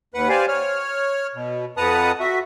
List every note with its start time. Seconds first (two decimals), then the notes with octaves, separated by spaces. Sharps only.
0.14 D#2 B4 F#5
0.29 G4 C5 D5 F5 G#5
0.48 C#5 F6
1.35 B2
1.77 F2 B4 F#5 A5 A#5 D#6
2.20 F#4 E5